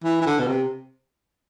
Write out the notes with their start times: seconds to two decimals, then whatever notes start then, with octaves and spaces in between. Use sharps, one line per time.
0.04 E3
0.21 E3
0.26 D3
0.39 B2
0.47 C3